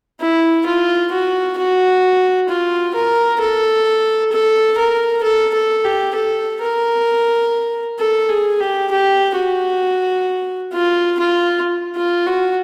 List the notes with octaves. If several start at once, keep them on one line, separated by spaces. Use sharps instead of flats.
E4
F4
F#4
F#4
F4
A#4
A4
A4
A#4
A4
A4
G4
A4
A#4
A4
G#4
G4
G4
F#4
F4
F4
F4
F#4